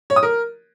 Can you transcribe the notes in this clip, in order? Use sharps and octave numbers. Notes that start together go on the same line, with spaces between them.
C#5
D#6
A#4